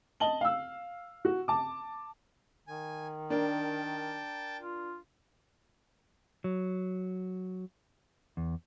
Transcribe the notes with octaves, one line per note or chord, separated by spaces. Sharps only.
D#5 A5 F#7 G7
F5 E6
F#4
A5 D6
D#3 G#5
D4 A#4 G5 A5
F4
F#3
E2